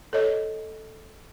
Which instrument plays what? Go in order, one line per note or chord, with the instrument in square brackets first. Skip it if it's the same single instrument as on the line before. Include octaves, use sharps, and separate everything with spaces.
[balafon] A4 C#5 D#5